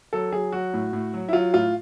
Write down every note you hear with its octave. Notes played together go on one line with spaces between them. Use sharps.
F#3 A4
F#3 G#4
F#3 F#4
A2
A2
F#3
E4
F#3 F4
A2 F4